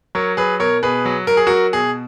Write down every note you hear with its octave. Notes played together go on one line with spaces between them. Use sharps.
F#3 A#4 C#5
F#3 G#4 B4
B2 A#4 C#5
B2 G#4 B4
F#3
F#3 A#4
G#4
F#3 F#4 A#4
B2 G#4